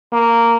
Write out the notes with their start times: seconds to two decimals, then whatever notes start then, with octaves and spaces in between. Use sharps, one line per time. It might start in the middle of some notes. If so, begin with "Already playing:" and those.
0.13 A#3